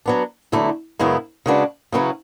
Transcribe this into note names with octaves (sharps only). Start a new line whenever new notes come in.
F#3 B3 D4
E2 D3 F#3 A3 E4
F#2 C#3 G#3 B3 E4
C#3 G#3 D4 F#4 B4
C#3 F#3 C#4 E4 B4